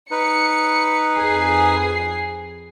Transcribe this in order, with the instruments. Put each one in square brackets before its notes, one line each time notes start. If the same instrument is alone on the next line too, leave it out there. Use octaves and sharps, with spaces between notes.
[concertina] D#4 B4 [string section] C#7
[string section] F2 G#4 C7